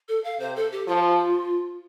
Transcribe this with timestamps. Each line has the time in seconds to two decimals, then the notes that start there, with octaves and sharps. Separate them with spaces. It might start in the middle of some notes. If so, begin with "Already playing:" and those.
0.09 A4
0.24 F5
0.40 C3 C5
0.56 A4
0.72 G4
0.87 F3 F4